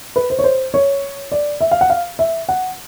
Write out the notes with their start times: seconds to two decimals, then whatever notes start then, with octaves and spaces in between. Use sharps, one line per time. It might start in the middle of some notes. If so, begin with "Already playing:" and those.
0.16 B4
0.30 C5
0.39 C#5
0.44 C5
0.74 C#5
1.32 D5
1.61 E5
1.71 F5
1.81 F#5
1.90 F5
2.19 E5
2.49 F#5